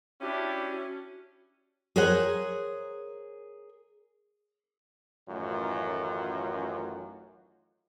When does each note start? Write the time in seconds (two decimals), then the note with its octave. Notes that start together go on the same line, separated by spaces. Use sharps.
0.21 C#4 D4 E4 F#4 G4
1.96 G#4 A#4 C5 C#5 F#5
5.29 A1 F#2 A2 D#3 F4